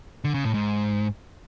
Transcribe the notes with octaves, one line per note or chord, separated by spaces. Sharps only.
D3
C#3
A2
G#2